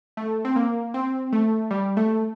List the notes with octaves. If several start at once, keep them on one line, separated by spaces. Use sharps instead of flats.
A3
C4
A#3
C4
A3
G3
A3